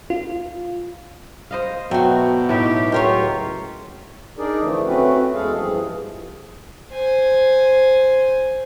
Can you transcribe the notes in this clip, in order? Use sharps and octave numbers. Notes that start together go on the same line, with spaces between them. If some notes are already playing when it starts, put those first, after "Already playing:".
F4
C5 D#5 F5
B2 F#3 A3 F#4 G5
A2 A3 D#4 G4
C#2 F#3 F4 G4 A#4 C#5
D4 D#4 G#4 A#4 D5
D3 E3 F3 A3
A3 C4 C#4 F#4 B4
E2 G#3 G#4 A4 F5
G2 E3 F3 G#4
C5 G#5